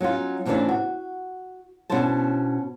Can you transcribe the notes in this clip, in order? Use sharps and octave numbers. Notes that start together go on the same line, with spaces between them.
F#3 C#4 D#4 F4
A2 C3 E3 C#4 D4 F4
F#4
B2 C#4 D4 E4 C5 A5